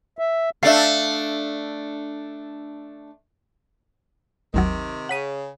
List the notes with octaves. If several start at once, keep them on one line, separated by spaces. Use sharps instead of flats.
E5
A3 D4 E5 F5
G#1 D#2 C3 D#3 F#3
C#3 F#5 B6 D#7